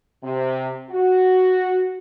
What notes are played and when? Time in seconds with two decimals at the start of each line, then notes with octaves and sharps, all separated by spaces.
0.24 C3
0.90 F#4